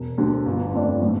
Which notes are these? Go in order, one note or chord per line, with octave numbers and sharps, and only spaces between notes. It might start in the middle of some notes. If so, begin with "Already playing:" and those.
Already playing: E1
D2 D3
G1
F2 D3 A3 D4
A2